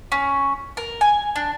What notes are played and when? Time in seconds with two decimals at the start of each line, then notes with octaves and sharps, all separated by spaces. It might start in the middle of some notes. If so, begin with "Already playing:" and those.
0.12 C#4
0.77 A#4
1.01 G#5
1.36 D4